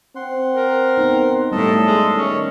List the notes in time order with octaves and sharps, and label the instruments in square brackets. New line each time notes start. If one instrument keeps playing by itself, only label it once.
[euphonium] C4 [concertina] F#5 C6
[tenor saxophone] A#4
[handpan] B3 D#4
[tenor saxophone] A2 [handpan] G3 A3 [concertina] A4 D#5
[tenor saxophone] G#3
[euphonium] D#3 [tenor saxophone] C#4